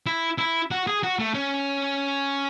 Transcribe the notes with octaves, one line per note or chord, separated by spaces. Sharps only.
E4
E4
F#4
G#4
F#4
A3
C#4